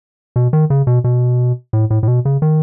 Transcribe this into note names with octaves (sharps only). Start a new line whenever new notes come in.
B2
D#3
C#3
B2
B2
A2
A2
A2
B2
C#3
D#3